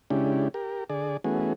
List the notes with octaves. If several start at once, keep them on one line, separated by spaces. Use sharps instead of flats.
C#3 G#3 C#4 D4 E4 G4
G4 A#4
D3 G#4 D5
E3 A3 B3 C#4 F#4 G#4